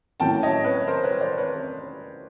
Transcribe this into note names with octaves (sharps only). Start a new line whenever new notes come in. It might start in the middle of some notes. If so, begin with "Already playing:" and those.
A2 F#3 A#3 C#4 G5 A5
C#5 D#5
B4 C#5
A#4 C5
B4 C#5
C5 D5
B4 C#5